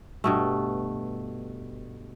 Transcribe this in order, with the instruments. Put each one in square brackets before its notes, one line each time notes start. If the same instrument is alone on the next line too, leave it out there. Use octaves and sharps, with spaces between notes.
[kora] G2 B2 A3